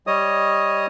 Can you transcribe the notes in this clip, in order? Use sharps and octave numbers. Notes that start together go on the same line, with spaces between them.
G3 C#5 D#5 D#6